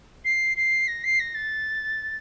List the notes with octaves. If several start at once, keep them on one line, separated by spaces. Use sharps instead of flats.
C7
C7
A#6
C7
A#6
A6